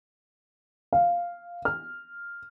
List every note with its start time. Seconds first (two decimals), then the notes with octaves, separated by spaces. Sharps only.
0.93 F5
1.65 F6